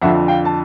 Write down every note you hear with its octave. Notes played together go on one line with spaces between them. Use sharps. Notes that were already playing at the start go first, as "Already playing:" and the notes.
F2 D3 F3 E5 F#5
F5 G5
A5